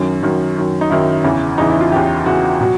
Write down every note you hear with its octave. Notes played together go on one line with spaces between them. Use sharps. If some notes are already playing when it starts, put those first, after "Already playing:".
Already playing: F#2 D#3 F#3
F#2 D#3 F#3
F#2 D#3 F#3
D#4
F#2 D#3 F#3 E4
E2 C#3 E3
E2 C#3 E3 D#4
E4
F4
E2 C#3 E3 G4
E2 C#3 E3 F#4
B2 F#3